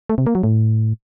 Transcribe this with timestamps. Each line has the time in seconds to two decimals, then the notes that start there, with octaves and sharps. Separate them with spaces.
0.09 A3
0.18 C3
0.26 A#3
0.35 F#3
0.43 A2